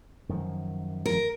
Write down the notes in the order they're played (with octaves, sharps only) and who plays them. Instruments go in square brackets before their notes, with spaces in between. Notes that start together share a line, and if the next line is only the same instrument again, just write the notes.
[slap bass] F#2 D#3 F3
[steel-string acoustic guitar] A#4